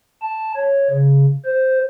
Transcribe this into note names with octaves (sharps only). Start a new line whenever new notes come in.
A5
C#5
C#3
C5